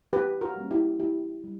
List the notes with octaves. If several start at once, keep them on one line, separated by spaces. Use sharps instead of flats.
E3 G4 B4
F#4 A#4
G3 A#3 C#4
E4 G4
E3 E4 G4
G3